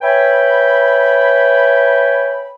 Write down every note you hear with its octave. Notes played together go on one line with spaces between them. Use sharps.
B4 C#5 E5 G5 G#5 B5